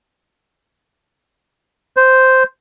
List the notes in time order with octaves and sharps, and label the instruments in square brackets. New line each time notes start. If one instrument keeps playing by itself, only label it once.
[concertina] C5